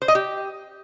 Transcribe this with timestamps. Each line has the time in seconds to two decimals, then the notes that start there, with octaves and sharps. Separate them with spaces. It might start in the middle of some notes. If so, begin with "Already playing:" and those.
0.02 C5
0.08 D#5
0.15 G4